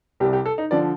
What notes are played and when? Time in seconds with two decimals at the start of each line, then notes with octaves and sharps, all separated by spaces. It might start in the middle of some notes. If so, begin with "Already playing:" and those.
0.20 C2 C3 G3 G4
0.33 G4
0.46 A4
0.58 D#4
0.71 D3 F3 D5